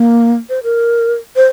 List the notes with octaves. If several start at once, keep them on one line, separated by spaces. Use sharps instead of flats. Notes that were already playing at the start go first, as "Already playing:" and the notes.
Already playing: A#3
C5
A#4
C5